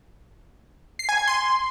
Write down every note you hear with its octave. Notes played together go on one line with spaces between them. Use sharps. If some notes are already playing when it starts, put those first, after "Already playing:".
C7
G#5
G#6
C6